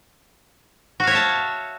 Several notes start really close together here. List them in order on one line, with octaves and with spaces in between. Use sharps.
F#4 F5 C#5 E5 A5